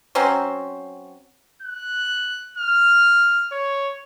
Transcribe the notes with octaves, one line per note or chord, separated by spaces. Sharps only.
F#3 C4 C#4 C5
F#6
F6
C#5